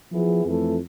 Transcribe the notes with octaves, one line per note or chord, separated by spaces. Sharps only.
F3 B3 E4 G#4
F2 E3 A3